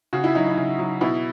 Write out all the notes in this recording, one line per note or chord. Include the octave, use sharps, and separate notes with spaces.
C#3 F#4
E4
F#3 D#4
E4
C#3
F#3
B2 E4